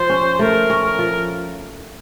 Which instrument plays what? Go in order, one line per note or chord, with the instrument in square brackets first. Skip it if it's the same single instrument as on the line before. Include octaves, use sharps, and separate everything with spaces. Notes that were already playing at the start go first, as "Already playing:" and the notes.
Already playing: [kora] F3 [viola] C5
[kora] C#4
[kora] A3 [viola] A#4
[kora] C#4
[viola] A#4
[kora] F3